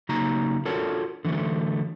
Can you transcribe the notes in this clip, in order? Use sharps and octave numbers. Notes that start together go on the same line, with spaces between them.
C#3 F#3 A#3 D#4 A#5
D4 F4 F#4 A4 A#4 C#5
D3 E3 F#3 A3